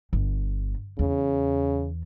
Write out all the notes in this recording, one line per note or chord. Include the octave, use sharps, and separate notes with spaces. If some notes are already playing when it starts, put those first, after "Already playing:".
G1
E2 C#3